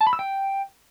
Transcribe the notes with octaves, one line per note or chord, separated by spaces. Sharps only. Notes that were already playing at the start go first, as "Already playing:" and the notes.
A5
B5
E6
G5